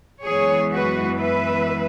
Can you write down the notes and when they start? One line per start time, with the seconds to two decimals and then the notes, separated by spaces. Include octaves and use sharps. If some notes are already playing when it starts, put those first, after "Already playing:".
0.25 F#2 E3 G#3 B3 G#4 C#5
0.72 F#4 B4
1.19 B4 E5